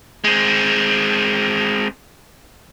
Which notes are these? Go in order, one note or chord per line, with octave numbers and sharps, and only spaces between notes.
G#3 C4